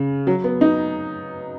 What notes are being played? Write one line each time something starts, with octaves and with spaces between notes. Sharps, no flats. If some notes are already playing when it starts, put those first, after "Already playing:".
Already playing: C#3
F#3
B3
D#4